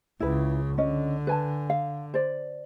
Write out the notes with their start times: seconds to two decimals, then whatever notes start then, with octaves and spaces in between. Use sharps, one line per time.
0.20 C#2 C#3 E4 B4
0.78 D3 C#4 D#5
1.27 B4 G#5 A5
1.70 F5
2.14 C5 D5